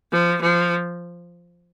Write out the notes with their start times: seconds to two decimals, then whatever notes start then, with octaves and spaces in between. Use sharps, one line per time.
0.12 F3
0.42 F3